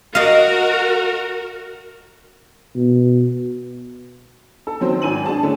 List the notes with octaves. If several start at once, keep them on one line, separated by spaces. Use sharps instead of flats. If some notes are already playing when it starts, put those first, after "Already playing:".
F#4 A#4 D#5 F5
B2
A4
D#3 F#3 C4 C5
G#1 G#5 D#7 F#7
D4 G#4 A5
D3 A3 C#4 E4